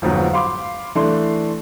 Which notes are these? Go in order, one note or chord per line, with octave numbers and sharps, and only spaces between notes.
G1 F2 G#2 F#3 B3
F5 B5 C6 D6
E3 A3 D4 C6